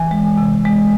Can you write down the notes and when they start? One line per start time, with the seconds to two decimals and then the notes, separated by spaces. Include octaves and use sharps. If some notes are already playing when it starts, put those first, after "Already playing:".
Already playing: E3 G#5
0.11 G#3
0.38 C3
0.65 G#3